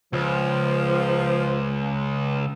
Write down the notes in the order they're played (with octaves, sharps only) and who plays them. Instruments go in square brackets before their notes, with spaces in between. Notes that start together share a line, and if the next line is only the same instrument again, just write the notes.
[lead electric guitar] C#2 [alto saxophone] F3